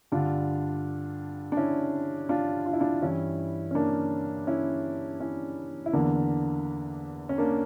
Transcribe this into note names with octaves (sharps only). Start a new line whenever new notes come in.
G2 D3 D4 F4
D4
C#4 E4
D4 F4
F4
E4
D4 F4
G2 E3 C#4 E4
C#4
A#3 D4
C#4 E4
C#4 E4
E4
E2 D3 A#3 D4
C#4
A#3 D4